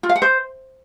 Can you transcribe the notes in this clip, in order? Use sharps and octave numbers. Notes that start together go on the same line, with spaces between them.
F4
F5
F#5
C5